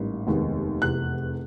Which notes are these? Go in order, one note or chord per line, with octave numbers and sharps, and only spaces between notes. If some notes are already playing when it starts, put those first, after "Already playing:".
Already playing: A1 G#2 G3 A#3
F1 D#2 D#3 G#3 B3
F1 E2 C3 F#6